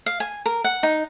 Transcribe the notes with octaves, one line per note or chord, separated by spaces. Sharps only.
F5
G#5
A#4
F#5
D#4